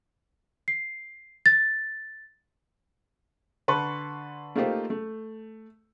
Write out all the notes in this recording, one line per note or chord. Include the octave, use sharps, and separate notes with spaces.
C7
A6
D3 B4 A5 C6 C#6
A3 A#3 D#4 F4 G4 C5
A3